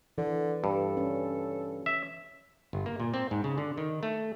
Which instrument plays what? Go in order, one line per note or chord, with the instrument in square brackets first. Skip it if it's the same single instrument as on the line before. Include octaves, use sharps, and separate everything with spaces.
[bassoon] D3 [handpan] E3
[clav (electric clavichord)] G2 [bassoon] A4
[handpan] C#4
[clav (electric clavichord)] E5
G1
A#3
A#2
C4
G#2
C#3
D3
D#3
A3